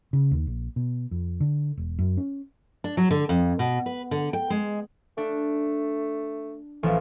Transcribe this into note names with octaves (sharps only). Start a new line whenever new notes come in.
C#3
D#2
A#1
B2
F2
D3
E1
F#2
C#4
D4
F#3
D3
F2
B2
B4
D3
G5
G#3
A3 D4
A1 F3 A3